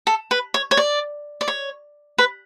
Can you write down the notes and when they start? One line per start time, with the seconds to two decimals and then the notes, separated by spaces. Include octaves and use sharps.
0.07 A4
0.31 B4
0.54 C#5
0.71 C#5
0.77 D5
1.41 D5
1.48 C#5
2.18 B4